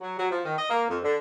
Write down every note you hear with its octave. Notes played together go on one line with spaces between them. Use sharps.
F#3
F#3
F3
D#3
D#5
A#3
F2
D3